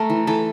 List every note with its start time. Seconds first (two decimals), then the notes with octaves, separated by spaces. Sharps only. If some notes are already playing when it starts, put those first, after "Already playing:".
Already playing: A3 A#4
0.10 E3
0.27 E3 A4